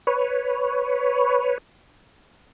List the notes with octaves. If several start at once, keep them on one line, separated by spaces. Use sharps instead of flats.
B4 C#5